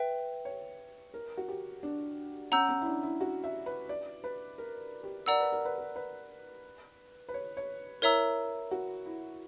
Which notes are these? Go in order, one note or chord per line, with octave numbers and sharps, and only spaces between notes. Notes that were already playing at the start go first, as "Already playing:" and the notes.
Already playing: B4 E5 G5
C#5
A#4
F#4
G4
D4
C#4 F#5 A#5 E6 G6
C#4
E4
D4
E4
F#4
E5
B4
D5
B4
A#4
G4
A#4 D5 F#5 A#5 E6
B4
A#4
B4
A#4
B4
B4
C#5
C#5
E4 A#4 C#5 E5 A#5 E6
F#4
E4